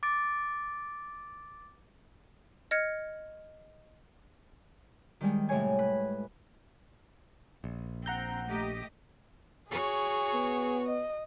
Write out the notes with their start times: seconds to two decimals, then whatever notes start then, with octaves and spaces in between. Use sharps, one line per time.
0.03 D6 A6 D7
2.71 D#5 F6 G#6 C#7
5.21 D#3 G3 G#3
5.49 A2 C3 G#3 C#5 G#5
5.79 B4
7.64 A#1
8.06 C4 F#5 A#5 G6
8.47 A3 G4 D#5
9.71 F#4 G#4 C#5
10.33 B3
10.86 D#5